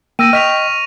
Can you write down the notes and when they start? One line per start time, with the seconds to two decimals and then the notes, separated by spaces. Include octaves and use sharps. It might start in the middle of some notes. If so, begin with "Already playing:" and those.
0.19 A#3 G5 D#6 E6 A#6 D#7
0.33 D#5 C#6 F6 B6 F7